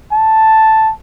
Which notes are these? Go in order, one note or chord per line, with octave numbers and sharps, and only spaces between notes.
A5